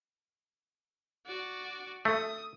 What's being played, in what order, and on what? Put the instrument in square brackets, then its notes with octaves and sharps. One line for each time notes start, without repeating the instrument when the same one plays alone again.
[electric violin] F#4 D5
[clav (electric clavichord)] A3 [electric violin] D#6